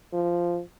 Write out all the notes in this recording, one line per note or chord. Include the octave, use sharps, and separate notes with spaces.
F3